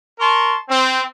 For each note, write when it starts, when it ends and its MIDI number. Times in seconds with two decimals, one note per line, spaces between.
0.19 0.56 70
0.19 0.56 81
0.19 0.56 84
0.19 0.56 85
0.69 1.01 60